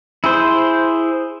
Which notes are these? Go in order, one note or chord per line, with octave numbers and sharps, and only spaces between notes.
E4 G#4 C5